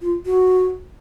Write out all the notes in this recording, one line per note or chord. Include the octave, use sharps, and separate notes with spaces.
F4
F#4